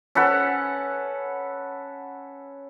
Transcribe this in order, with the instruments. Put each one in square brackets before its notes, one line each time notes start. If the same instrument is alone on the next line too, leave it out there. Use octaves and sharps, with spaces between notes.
[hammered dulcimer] C#4 A4 B4 F#5